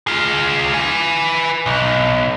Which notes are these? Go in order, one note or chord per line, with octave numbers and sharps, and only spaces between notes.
F4 G#4
B4 G#5
B1